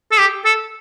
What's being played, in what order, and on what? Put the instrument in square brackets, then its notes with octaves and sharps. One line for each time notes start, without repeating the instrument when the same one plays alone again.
[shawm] A4
G4
A4